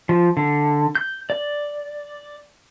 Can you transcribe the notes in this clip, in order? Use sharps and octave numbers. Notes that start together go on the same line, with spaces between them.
F3
D3
G6
D5